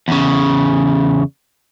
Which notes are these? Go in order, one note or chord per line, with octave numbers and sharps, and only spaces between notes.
E2 C#3